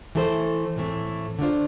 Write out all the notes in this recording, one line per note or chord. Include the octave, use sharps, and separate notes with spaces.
E3 A3 E4 A4 C5
A2 E3 A3 C4
D3 A3 D4 F4 C5